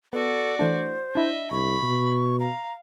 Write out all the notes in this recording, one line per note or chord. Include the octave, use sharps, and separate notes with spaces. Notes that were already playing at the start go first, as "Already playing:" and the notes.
B3 F#4 A4 D5
E3 A3 D4 C5
D4 E4 D#5 E5
C2 B5 C#6
B2
F5 A#5